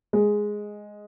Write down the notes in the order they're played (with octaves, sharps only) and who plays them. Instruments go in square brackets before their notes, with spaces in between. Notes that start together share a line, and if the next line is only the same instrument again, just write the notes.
[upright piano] G#3